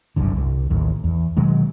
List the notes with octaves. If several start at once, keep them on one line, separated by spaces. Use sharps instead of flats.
G1 C2 F#2 D3
C2
A1 D#2
E2
B2 D#3 F#3 G#3